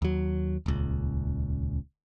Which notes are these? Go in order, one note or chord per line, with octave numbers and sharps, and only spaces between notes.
D#2 F#3
D#1 C#2